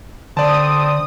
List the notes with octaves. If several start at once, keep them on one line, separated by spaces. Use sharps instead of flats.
D3 C4 D5 A5 D#6